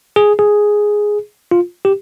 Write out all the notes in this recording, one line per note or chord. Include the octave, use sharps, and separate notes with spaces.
G#4
G#4
F4
G4